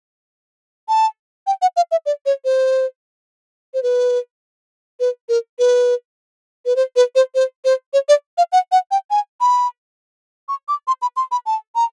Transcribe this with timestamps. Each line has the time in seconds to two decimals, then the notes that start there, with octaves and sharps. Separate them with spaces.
0.89 A5
1.47 G5
1.62 F#5
1.77 F5
1.91 E5
2.06 D5
2.26 C#5
2.45 C5
3.74 C5
3.83 B4
5.00 B4
5.29 A#4
5.59 B4
6.66 B4
6.76 C5
6.96 B4
7.15 C5
7.35 C5
7.65 C5
7.93 C#5
8.09 D5
8.38 F5
8.52 F#5
8.72 F#5
8.91 G5
9.11 G#5
9.41 B5
10.48 C#6
10.68 D6
10.87 C6
11.02 B5
11.17 C6
11.31 B5
11.46 A5
11.75 A#5